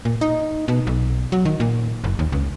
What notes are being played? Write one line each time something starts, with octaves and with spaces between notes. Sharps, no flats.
A#2
D#4
B2
B1
F#3
D#3
A#2
F#1
D#2
C#2